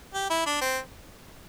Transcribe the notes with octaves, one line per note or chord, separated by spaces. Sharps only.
G4
E4
D4
C4